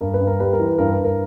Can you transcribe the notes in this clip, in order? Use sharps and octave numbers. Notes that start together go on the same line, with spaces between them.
G2 A#4
B4
G2
A#4
G3 B4
A#4
E3
B4
G2 A#4
B4
G2
A#4